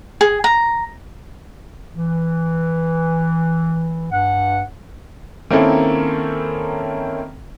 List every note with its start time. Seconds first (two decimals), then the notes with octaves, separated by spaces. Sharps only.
0.21 G#4
0.44 A#5
1.94 E3
4.11 G2 F#5
5.51 D#3 A#3 C4 C#4 E4 A4